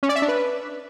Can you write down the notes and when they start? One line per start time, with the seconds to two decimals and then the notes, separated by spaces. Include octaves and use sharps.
0.03 C#4
0.09 D5
0.16 E5
0.22 D4
0.28 B4